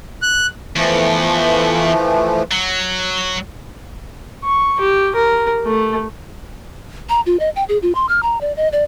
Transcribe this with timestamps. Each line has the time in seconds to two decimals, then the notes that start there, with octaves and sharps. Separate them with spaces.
0.22 F#6
0.76 E2 E3 F3 A3
2.51 F#3
4.44 C#6
4.80 G4
5.15 A#4
5.66 A3
7.09 A#5
7.26 F4
7.40 D#5
7.56 G5
7.69 G#4
7.82 F4
7.95 C6
8.09 F6
8.23 A#5
8.41 D5
8.57 D#5
8.72 D5